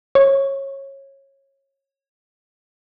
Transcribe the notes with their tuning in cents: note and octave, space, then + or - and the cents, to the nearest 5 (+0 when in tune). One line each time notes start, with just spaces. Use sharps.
C#5 -20